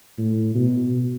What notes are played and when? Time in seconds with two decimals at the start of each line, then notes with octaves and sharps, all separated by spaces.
0.18 A2
0.55 B2